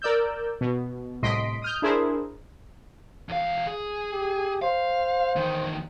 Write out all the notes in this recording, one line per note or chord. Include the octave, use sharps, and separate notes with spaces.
A#4 D5 E6 G6
B2
C2 A2 D#5 C6 B6 D7
D#6 F6 G6
D4 E4 G#4 A#4 C5
E2 F5
G#4
G4
C5 F5
E2 D#3